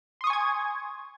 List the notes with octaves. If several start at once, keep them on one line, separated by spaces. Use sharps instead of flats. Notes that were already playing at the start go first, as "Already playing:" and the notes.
G#5 C6 C#6 D#6 G#6